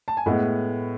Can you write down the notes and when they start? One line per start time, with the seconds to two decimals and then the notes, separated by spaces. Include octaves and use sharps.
0.08 A5
0.17 G#5
0.26 A2 G#3 B3 D#5 F#5